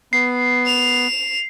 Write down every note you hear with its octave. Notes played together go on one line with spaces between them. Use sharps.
B3 C7
E7 F7